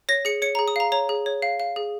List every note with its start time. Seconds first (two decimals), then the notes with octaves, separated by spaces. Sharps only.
0.09 C#5 A#6
0.25 G#4 C#7
0.42 C#5 C#7
0.55 A#5
0.59 G#4
0.68 D#6
0.76 F5 A#5
0.92 C#5 A#5
1.09 G#4
1.26 C#5
1.42 F5
1.60 F5
1.76 G#4